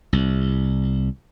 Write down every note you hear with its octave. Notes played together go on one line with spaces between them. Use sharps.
C2